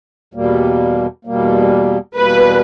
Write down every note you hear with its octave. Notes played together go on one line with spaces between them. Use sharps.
E2 B2 G3 A#3
E2 B2 G3 A#3
E2 B2 G3 A#3 B4